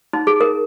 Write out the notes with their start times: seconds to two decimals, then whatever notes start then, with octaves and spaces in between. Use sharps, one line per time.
0.13 D#4
0.27 G#4
0.41 A#4